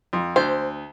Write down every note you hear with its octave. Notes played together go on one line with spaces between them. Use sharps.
F2
D2 C5